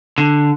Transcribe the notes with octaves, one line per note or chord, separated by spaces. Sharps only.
D3